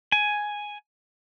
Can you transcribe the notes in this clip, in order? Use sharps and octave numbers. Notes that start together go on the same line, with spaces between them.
G#5